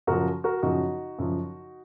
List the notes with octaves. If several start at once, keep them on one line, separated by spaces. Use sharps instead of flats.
F#2 C#3 F3 F#4 A#4
F#4 A#4
F#2 C#3 F3 D#4 F#4
F#2 C#3 F3